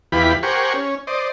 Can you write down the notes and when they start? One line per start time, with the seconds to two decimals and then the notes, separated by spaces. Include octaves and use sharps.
0.12 E2 E3 F4 G4 B4 B5
0.43 G4 A#4 C5 F#5 G#5 C#6
0.73 C#4
1.07 C5 D5 D#5